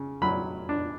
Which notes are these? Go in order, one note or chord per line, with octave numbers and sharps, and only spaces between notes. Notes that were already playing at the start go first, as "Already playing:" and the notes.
Already playing: C#3
F#3 B5
D4